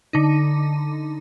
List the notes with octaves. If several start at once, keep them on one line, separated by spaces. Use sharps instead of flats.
D3 D#4